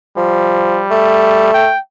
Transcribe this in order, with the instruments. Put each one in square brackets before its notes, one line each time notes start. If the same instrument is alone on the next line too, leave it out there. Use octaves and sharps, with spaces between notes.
[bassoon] F3 [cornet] G3
[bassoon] A3
[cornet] G5